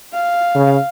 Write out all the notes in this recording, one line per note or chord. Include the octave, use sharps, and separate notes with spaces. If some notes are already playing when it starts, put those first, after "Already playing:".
F5
C#3